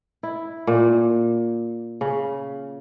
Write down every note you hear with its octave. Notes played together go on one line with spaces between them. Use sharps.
E4
A#2
C#3